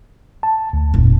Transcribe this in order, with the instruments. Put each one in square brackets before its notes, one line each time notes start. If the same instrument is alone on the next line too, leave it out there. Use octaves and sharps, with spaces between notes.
[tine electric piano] A5
D2
[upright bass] F1 A#2